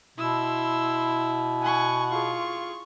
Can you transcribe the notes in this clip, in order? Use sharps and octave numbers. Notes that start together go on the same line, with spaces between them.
B2 E4 C6 E6
F#5 G#5 C#6
F4 G#4 C#6